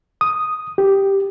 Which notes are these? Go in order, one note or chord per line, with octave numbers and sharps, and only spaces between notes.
D#6
G4